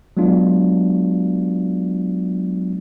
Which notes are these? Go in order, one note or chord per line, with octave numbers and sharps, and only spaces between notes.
F#3 G#3 B3 D4 F4